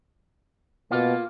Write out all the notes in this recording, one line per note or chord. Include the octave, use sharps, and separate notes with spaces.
B2 A#3 F4